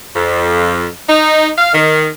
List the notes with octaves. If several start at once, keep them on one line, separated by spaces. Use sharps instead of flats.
F2
D#4
F5
D#3